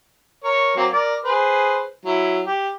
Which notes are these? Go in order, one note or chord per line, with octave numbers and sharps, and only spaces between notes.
A#4 C#5
F#3 A#3 C4
A#4 D5
G#4 B4 C5
F#3 E4
G4